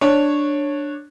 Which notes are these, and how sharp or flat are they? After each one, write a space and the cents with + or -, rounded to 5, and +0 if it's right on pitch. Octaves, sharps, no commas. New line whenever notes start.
D4 +0 C#5 -5